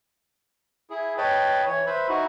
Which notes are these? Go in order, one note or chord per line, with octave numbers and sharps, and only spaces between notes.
E4 G#4
B4 C#5 D#5 G5 A5 B5
E3 C#5
B4 C5 E5 B5
D#4 E4 F#4